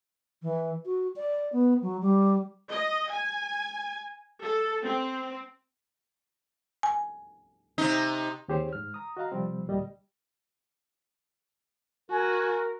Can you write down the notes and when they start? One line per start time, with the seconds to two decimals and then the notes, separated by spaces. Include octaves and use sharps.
0.42 E3
0.85 F#4
1.16 D5
1.52 B3
1.82 F#3
2.02 G3
2.71 D#5
3.11 G#5
4.42 A4
4.83 C4
6.83 G#5
7.78 C3 D#4
8.48 D#2 C4 G4 G#4 C5 C#5
8.73 G#2 F6
8.94 A#5 D#6
9.17 F#4 D#5 F5 A#5
9.32 C3 F3 G3 C4
9.67 D2 A#2 G3 D#5
12.10 F#4 A#4 G#5